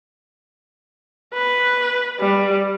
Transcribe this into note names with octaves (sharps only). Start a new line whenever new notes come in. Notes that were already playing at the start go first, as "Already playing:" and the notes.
B4
G3